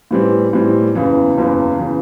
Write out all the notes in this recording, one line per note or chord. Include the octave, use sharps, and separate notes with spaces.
A2 E3 G3 C4
A2 E3 G3 C4
F#1 E2 C#3 E3
F#1 E2 C#3 E3
C#3 E3